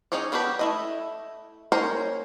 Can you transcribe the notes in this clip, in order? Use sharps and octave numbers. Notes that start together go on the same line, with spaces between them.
C#4 D#4 G#4 C#5 D5
B3 D4 F#4 G4 B4
A3 E4 D#5
A#3 C#4 A#4 C5 C#5